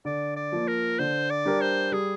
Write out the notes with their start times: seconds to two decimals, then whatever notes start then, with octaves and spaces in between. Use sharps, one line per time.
0.05 D3 D5
0.36 D5
0.52 F3 A#3
0.67 A#4
0.99 D3 C5
1.30 D5
1.45 G3 D4 G4 A#4
1.61 C5
1.92 G3 G#4